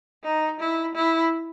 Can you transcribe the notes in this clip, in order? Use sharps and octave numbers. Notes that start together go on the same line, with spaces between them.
D#4
E4
E4